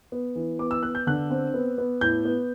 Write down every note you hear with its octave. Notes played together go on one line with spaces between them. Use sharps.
B3
E3
B3 D6
E6
B3 F#6
G6
D3 F#6
C4
B3
B3
A2 G6
B3